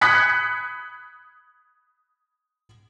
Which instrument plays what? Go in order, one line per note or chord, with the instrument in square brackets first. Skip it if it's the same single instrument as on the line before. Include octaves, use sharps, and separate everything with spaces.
[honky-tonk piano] B5 D#6 F#6 G#6 B6 C#7